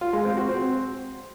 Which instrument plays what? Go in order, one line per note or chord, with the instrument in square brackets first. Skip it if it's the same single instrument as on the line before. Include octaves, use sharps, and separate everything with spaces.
[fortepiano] F4
G#3
C4
F#4
C4